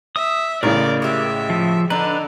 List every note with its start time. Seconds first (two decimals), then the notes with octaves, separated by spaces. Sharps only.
0.16 E5 D#6
0.63 A1 A2 C#3 D#4 A#4 D5
1.02 G#3 G4 E5
1.50 F3
1.90 D3 D4 D#4 B4